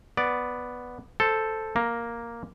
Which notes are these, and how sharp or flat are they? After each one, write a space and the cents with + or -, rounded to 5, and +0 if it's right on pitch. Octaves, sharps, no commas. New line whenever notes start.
B3 +0 D5 +0
A4 +0 C5 +0
A#3 +0 A#5 +0